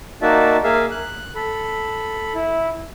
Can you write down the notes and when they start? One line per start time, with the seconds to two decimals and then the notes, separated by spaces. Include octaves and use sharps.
0.22 A#3 D#4 F#4 D5 E5 A5
0.64 A#3 G#4 E5 F5
0.91 F#6
1.36 A4 B5
2.35 E4